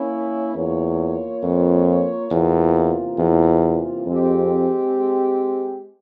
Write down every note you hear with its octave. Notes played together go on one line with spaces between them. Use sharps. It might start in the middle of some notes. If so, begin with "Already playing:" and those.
Already playing: A#3 C#4 E4
E2 A#3 F4 A#4 C#5
F2
E2 C3 E3 A#3 F4 A#4
E2
F2 G#3 C4 G4